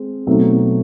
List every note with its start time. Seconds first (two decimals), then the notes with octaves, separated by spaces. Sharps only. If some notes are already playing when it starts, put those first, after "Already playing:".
Already playing: G#3 C4 G#4
0.27 B2 F#3 A3 C4 D#4